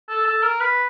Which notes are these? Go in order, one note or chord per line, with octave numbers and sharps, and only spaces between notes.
A4
A4
A#4
B4